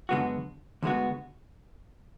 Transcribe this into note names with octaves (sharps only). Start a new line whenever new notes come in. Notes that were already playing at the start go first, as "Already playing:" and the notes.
F#2 D3 G#3 B3 F#4
D2 D3 G#3 B3 F#4